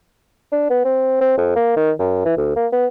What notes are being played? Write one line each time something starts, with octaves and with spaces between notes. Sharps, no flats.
D4
B3
C4
C4
F2
A#3
D#3
F#2
E3
D2
A#3
B3